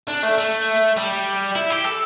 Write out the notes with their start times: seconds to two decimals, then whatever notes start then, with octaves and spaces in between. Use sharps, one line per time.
0.08 D4
0.23 A3
0.38 A3
0.96 G3
1.55 E4
1.70 G4
1.84 A4